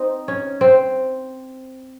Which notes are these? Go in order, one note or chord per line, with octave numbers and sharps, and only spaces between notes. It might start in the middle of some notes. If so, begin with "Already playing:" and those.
Already playing: C4 D#4
C#4
C4